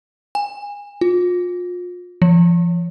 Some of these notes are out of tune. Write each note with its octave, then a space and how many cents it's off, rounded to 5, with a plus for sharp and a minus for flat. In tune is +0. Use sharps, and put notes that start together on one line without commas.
G#5 -25
F4 +35
F3 -30